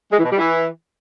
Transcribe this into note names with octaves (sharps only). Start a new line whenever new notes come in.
G#3
E3
B2
G3
E3